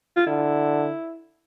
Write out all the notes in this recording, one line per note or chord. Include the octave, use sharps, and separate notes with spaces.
F4
D3 E4